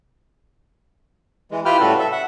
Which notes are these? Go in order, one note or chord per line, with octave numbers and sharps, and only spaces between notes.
E3 G#3
E4 F4 G4 B4 G5 F6
A2 C#3 G3 F#4 A4 B4
A4 E5
E5 F#5